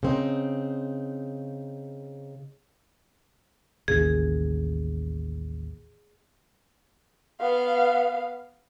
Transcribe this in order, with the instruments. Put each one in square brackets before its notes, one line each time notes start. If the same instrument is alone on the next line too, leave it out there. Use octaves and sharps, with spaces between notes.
[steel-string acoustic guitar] C#3 C4 D#4
[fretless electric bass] A1 D#2 C#3 [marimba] G#4
[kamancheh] B3 F5